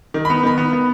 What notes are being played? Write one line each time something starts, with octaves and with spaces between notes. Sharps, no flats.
D#3
B5
B3
D#3 B5
B3
B3